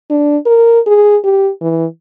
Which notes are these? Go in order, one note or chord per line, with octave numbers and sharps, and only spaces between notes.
D4
A#4
G#4
G4
E3